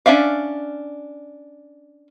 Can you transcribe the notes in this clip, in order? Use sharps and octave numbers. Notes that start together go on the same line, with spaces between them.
C#4 D4 D5 E5 F5